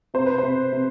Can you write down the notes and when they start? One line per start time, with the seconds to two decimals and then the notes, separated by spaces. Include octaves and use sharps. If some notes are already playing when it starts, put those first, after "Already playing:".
0.14 C3 C5
0.26 B4
0.38 C3 C5
0.72 C3